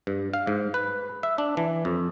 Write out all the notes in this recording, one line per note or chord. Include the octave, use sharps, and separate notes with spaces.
G2
F5
G#2
B4
E5
D4
E3
F2